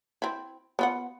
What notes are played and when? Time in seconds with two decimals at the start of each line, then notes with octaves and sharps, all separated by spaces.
0.22 C4 E4
0.79 B3 F4 F#5